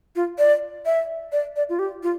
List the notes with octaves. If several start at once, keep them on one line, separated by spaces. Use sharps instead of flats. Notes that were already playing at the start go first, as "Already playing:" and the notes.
F4
D5
E5
D5
D5
F4
G4
F4